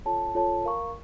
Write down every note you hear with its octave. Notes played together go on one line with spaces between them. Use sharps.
F4 A4 C#5 A5
F4 A4 C#5 A5
A#4 F5 A#5 C#6